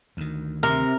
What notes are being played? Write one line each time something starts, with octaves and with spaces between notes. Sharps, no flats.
D2 D#3
C3 A#4